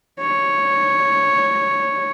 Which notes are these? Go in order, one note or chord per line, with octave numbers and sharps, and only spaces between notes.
C#5